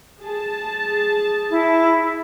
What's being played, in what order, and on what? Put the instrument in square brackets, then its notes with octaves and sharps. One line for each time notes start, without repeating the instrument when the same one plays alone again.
[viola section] G#4 A5
[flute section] E4